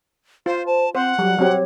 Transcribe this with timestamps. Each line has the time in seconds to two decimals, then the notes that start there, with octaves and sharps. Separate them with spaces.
0.46 F4 C5
0.66 C5 A5
0.95 C4 C5 F#5
1.19 F#3 G3
1.39 F#3 C4 G4 C#5